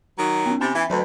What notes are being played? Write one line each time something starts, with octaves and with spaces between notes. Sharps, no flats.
D#3 F#3
B3 C#4
C3 G#5 B5 A6
E3 E5 B6
D2 F#3 B4